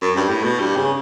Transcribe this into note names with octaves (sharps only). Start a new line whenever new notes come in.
F#2
G2
A2
B2
G2
C#3